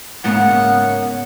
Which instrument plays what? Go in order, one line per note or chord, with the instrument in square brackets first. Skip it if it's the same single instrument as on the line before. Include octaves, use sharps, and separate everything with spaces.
[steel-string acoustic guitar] G#2 C#3 A#3 [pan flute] B3 [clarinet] F#5